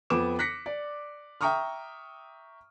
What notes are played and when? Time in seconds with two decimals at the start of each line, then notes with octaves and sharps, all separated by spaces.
0.10 F2 B3 D6 E7
0.39 F#6 A#6 B6 C#7
0.66 D5
1.41 E5 G5 A#5 C#6 D#6 F6